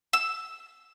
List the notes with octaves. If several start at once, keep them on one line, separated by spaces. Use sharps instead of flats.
E6